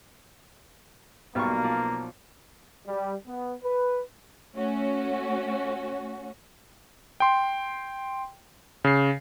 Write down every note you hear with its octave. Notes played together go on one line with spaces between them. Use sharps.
B1 B2 G3 A#3 F4 C#6
F3 D5
G3
B3
B4
A3 C#4 F#4
G5 C6
C#3 C7